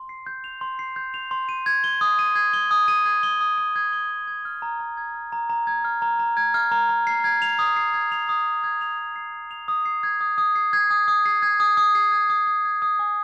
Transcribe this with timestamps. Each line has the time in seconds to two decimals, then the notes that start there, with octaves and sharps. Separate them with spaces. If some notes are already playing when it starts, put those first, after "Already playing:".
Already playing: C6
0.09 C7
0.26 G6
0.44 F7
0.61 C6
0.79 C7
0.96 G6
1.14 F7
1.31 C6
1.49 D#7
1.66 G#6
1.84 G7
2.01 D#6
2.19 D#7
2.35 G#6
2.53 G7
2.71 D#6
2.88 D#7
3.06 G#6
3.23 G7
3.41 D#6
3.58 D#7
3.76 G#6
3.93 G7
4.10 D#6
4.28 G#6
4.45 F6
4.62 A#5
4.80 A#5
4.97 G#6
5.15 F6
5.32 A#5
5.50 A#5
5.67 G#6
5.85 F6
6.02 A#5
6.19 A#5
6.37 G#6
6.54 F6
6.71 A#5
6.89 A#5
7.07 C7
7.24 G#6
7.42 F7
7.59 D#6
7.76 C7
7.94 G#6
8.12 F7
8.29 D#6
8.46 C7
8.64 G#6
8.81 F7
8.98 D#6
9.16 C7
9.33 G#6
9.51 F7
9.68 D#6
9.86 C7
10.03 G#6
10.21 D#6
10.38 D#6
10.56 C7
10.73 G#6
10.91 D#6
11.08 D#6
11.26 C7
11.42 G#6
11.60 D#6
11.77 D#6
11.95 C7
12.12 G#6
12.30 D#6
12.47 D#6
12.65 G#6
12.82 D#6
12.99 G#5